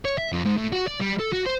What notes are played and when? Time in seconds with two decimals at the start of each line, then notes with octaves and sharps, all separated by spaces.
0.05 C#5
0.18 E5
0.33 F2
0.46 G#2
0.58 A2
0.73 F#4
0.88 D5
1.01 G3
1.20 A4
1.33 F#4
1.46 C5